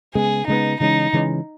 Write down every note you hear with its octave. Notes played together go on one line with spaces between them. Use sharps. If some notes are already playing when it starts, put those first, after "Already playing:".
C#3 G#3 B3 G#4
C#3 G#3 B3 D#4
C#3 E3 G#3 C#4 D#4
C#3 E3 G#3 C#4